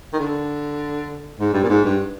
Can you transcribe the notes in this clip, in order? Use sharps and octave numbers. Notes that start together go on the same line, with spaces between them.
D#3
D3
G#2
G2
A#2
G#2
G2